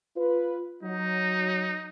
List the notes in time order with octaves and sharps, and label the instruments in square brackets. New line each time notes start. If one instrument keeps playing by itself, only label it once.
[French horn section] F4 B4
[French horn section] F#3 [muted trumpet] D#4